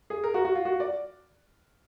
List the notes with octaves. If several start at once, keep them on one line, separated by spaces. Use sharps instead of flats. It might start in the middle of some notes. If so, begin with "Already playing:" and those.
G#4
A#4
F#4
F#4
F4
F#4
D5